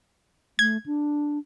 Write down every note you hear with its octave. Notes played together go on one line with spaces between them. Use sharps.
A3 G#6
D4